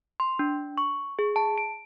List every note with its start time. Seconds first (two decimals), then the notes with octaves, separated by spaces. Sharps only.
0.20 C6
0.39 D4
0.78 C#6
1.19 G#4
1.36 A5
1.58 D7